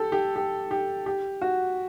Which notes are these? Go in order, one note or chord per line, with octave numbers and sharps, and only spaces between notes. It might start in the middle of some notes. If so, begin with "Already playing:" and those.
Already playing: G4 A4
G4
G4
G4
G4
F#4